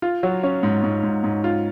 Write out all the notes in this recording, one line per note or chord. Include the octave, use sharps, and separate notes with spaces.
F4
F#3
C#4
G#2
G#2
G#2
G#2
F4